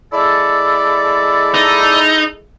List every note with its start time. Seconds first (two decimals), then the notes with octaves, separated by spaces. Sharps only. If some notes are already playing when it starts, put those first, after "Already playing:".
0.13 G#3 E4 A4 D5
1.54 D#4